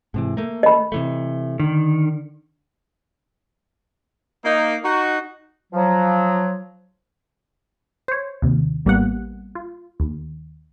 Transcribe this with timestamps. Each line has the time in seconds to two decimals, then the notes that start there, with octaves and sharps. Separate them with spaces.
0.14 G#2 C3 E3
0.37 A3 A#3
0.63 D#5 B5
0.92 C3 E3 A3
1.60 D3 D#3
4.45 A#3 D#4
4.84 D#4 F#4
5.73 F3 F#3
8.08 C5 C#5
8.42 D#2 C3
8.85 A1 G3 A#3 B3 F#5
9.55 F4
10.00 D#2